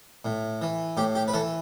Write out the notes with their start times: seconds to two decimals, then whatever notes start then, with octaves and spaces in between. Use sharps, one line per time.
0.25 A2
0.62 E3
0.97 A2 G4
1.15 G4
1.28 B4
1.34 E3 A4